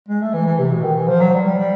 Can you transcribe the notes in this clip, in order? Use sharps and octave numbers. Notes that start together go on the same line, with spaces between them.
G#3
A3
E3
E3
C3
B2
D#3
E3
F3
F#3
G3
G3
G3